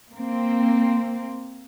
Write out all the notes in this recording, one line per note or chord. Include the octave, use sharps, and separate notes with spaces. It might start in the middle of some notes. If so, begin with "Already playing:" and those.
A#3 C4